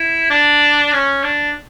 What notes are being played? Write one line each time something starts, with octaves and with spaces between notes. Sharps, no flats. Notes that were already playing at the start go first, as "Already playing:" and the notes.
Already playing: E4
D4
C#4
D4